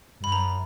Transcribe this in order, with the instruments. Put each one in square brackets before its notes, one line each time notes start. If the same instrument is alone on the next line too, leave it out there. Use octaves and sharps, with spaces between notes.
[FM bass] G2 [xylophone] B5
[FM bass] F#2 [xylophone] A#5